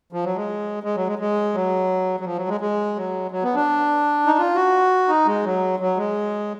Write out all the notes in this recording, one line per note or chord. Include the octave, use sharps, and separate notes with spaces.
F3
F#3
G#3
G#3
F#3
G#3
G#3
F#3
F#3
F3
F#3
G#3
G#3
F#3
F#3
B3
D4
D#4
F4
F#4
D#4
G#3
F#3
F#3
G#3